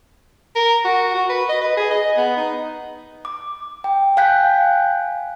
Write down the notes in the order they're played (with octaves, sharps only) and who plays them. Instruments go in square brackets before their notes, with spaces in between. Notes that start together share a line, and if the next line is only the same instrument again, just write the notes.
[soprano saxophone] A#4
F#4
F#4
B4
D#5
B4
G#4
D#5
B3
D#4
[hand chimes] D6
G5
F5 G5 G#5 F#6 G6 B6